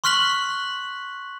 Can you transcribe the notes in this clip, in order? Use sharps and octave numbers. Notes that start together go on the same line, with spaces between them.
C6 C#6 F6 F#6 B6 F#7